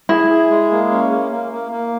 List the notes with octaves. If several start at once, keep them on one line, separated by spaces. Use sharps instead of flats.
E4 G#4
G#4
G#3
A#3
C#4
A#3
A#3
A#3
A#3